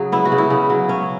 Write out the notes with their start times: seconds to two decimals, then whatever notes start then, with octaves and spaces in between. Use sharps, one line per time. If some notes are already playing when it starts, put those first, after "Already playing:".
Already playing: C#3 F#3 G#4
0.12 B3 E4
0.25 F#4
0.32 C#3
0.38 E4
0.50 C#3
0.70 F#3
0.89 C#4